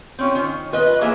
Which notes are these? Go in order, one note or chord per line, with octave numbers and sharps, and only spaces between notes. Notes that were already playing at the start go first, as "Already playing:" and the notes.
C4 C#4 F4
D#3
F4 B4 D#5
E3 A#3 G#4 E5